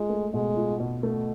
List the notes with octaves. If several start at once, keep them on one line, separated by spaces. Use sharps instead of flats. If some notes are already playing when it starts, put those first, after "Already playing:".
Already playing: G#3 F4
A3
B2 G#3
F4
B2
A3